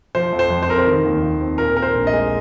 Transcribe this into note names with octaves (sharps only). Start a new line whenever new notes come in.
F3 C5
F2
C5
F2
C5
C4 A#4
C5
D#3
D#2
D#2
C4
A#2 A#4
C4 A#4
C5
A#1
D#5
G#3